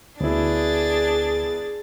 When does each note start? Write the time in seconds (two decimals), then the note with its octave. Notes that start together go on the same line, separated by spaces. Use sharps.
0.21 D2 B3 D4 E4 G#4 A6